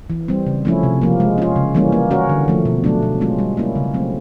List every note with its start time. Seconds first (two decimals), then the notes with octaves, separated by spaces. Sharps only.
0.10 E3
0.28 G3 C4
0.46 C#3
0.65 F3 A3 C#4 E4
0.83 C3
1.02 F3 A#3
1.20 G#3
1.38 C#4 F4
1.56 C#3
1.75 E3 G3 A#3 C#4
1.92 A#3
2.11 C#4 F#4 A#4
2.29 D3
2.48 F3 A3
2.65 B2
2.84 F#3 A3 D4
3.03 B2
3.21 G#3 C#4 F4
3.38 G3
3.57 A#3 C#4 E4
3.75 C#3
3.94 F#3 A3 C4